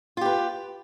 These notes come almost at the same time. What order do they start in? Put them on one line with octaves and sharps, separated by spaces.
F4 G4 B4